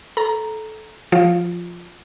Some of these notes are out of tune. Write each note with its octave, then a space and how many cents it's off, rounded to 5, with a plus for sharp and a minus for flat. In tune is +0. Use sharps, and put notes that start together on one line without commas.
A4 -20 A#5 +0
F3 +0 F4 +0